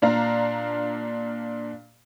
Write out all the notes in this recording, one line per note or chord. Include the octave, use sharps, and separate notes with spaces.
A#2 D4 F5 A#5